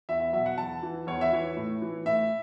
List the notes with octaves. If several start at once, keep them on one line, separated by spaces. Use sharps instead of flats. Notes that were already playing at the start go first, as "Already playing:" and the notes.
E2 E5
E5
B2 F#3 E5
F#5
E2 A5
E3
E2 C#5
E5
E3 C#5
A2
E3
A2 E5